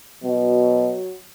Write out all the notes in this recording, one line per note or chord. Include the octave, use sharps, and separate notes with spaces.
B2 F#3